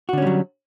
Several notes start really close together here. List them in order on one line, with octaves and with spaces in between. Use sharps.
F#4 D3 C#4 G3 F#3